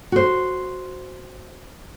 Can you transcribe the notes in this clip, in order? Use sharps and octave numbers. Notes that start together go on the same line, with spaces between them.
F#4 C5